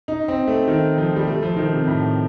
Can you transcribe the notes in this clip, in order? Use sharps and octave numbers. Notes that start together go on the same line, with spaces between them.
D#4
C4
A3
D#3
F3
G3
A3
F3
D#3
C3
A2